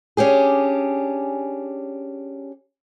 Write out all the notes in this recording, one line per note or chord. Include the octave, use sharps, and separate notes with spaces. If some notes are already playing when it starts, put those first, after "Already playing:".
C#4 D4 G4 G#4